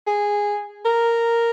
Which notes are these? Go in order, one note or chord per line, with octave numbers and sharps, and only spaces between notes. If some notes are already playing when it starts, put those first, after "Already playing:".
G#4
A#4